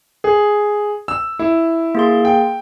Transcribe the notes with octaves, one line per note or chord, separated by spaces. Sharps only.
G#4
E6
E4
A#3 G#4 C6
G5